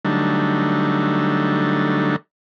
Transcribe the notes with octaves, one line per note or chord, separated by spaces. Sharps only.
D3 F#3 G3 A3 D4 D#4